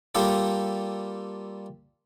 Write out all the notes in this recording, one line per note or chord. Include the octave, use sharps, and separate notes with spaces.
G3 A#3 F4 G4 A4